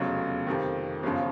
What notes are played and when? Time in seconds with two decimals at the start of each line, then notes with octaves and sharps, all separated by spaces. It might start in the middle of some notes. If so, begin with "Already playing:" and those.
Already playing: F1 E2 C#3 F#3
0.47 F2 C3 D#3
1.03 G1 F#2 C#3 F3